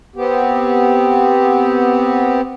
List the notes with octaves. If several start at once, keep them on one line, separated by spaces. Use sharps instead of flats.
B3 C4 G4